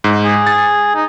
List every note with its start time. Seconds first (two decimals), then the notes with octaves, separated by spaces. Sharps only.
0.04 G#2
0.25 G#4
0.47 A6
0.95 D#4